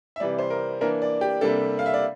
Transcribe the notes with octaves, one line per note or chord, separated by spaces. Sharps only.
E5
C3 E3 G3 D5
C5
A#4
E3 A#3 D4 A#4
D5
G4
C3 G3 A#3 D4 A4
F5
E5
D5